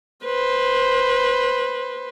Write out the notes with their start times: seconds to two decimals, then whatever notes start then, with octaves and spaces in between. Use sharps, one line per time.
0.24 B4 C5